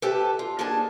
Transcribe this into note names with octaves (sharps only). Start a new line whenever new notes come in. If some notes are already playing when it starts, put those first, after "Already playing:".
G4 A4 B4 E5 G5 A5
F4
A#3 D4 D#4 G#4 A5